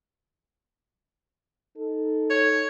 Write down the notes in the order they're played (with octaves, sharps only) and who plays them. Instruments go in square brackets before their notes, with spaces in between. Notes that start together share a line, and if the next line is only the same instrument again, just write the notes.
[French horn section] D#4 A4
[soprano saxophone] C#5